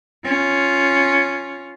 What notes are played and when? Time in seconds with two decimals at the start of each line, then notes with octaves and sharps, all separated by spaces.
0.25 C#4 F4